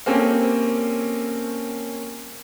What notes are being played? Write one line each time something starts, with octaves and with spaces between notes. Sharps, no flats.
A#3 C4 C#4 G4 A4